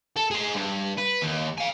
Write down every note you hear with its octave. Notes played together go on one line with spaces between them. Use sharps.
A4
G#4 C5
G2
B4
D#2
F5 G#5